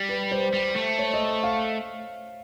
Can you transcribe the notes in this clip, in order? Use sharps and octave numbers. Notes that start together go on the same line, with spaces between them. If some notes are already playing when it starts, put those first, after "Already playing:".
Already playing: G3
B4
C5
G3
A3
C#5
D#5
F5